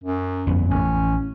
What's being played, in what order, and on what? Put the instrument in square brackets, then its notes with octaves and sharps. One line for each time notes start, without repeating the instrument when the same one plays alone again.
[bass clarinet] F#2
[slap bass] G1 F2 B3
[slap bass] A1 [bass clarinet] C#4